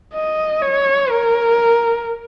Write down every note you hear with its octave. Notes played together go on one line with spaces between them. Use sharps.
D#5
C#5
A#4